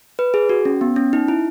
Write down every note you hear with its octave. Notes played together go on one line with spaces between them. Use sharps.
B4
G#4
F#4
C#4
B3
C#4
D#4
E4